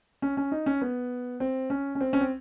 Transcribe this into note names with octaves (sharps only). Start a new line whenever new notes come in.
C#4
C#4
D#4
C#4
B3
C4
C#4
C#4
C4
C#4
C4